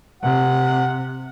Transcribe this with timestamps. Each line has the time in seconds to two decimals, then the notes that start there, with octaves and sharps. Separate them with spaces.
0.23 C3 F#5